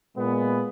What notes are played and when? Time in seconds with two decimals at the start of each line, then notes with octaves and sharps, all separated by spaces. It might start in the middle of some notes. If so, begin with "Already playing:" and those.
0.15 A#2 G#3 B3